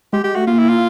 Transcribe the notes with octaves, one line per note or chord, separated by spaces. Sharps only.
G#3 G4
G#3 G4
A3 F#4
A#3 F4
E4
F4